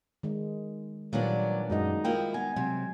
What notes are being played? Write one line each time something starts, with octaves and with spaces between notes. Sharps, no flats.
D#3 G#3
A#2 D#3 F#3 G3 B3 D4
F#2 G#3 D#4 F#4 D#5
F3 A#3 E4 G5
B3 D#4 G#5
C3 F#3 C4